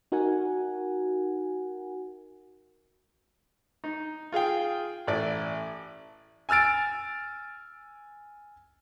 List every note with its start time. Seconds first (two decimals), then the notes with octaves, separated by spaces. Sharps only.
0.12 D#4 F#4 A#4 F#5 G#5
3.84 D#4
4.32 F4 G#4 F5 G5
5.07 A1 E4 D5
6.49 G#5 E6 F6 A6 D7